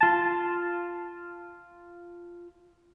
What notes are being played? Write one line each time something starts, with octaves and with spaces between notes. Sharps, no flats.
F4 A5